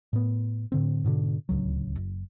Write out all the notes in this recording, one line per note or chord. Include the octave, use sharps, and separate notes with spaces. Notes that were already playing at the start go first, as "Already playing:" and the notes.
A2 B3
A2 D3 C4
G#2 B2 D3
D1 C#2 F#3
F#1